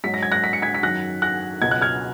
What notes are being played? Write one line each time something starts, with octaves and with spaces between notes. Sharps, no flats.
G#2 F#3 B6
A#6
G#6
F#6 A#6
B6
C#7
G#6 B6
B6
F#2 D#3 F#3 F#6 A#6
F#6 A#6
C#2 B2 F#3 G#6
F#6
F6 G#6